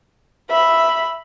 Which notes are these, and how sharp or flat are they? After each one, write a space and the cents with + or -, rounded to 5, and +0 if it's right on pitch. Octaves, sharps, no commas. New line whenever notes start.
E5 +0 B5 +0